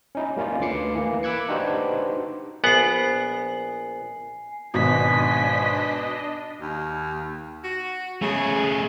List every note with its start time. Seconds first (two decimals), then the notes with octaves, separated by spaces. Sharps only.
0.15 C#4 D#4 E4
0.37 G3 A#3 C#4 D#4 F4
0.60 D2 D3 B4 D6 C7 C#7
0.95 E3 A#3
1.23 B5 D6 E6 F#6 G#6 C#7
1.49 D4 D#4 F#4 G4 B4 C5
2.64 A#1 B3 F#5 G#5 C7
4.74 G#1 B2 D4 D#5 G#5 B6
6.61 D#2
7.64 F#4
8.22 C#3 A3 G#4